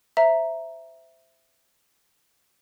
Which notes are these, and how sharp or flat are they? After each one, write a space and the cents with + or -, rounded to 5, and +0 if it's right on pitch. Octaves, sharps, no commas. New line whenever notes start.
C5 -10 E5 +0 A#5 +0